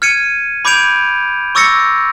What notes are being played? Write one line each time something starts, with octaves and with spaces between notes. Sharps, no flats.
F6 G#6 C#7 D#7
B5 D6 G6 G#6 D7 F7
C#6 D6 E6 A6 A#6 C#7